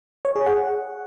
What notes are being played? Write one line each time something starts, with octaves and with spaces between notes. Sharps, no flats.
C#5
G#4
F#5